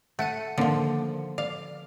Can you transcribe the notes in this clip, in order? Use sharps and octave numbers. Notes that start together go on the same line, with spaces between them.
A3 F#5 C#7 D#7
D3 D#3 F3 A#3
D5 F5